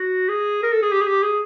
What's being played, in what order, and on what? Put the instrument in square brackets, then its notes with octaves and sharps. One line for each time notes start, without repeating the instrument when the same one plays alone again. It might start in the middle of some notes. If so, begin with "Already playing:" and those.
Already playing: [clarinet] F#4
G#4
A#4
A4
G#4
G4
G#4
G4
G#4